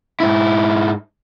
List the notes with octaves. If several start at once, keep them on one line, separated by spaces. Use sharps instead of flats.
G#2 E4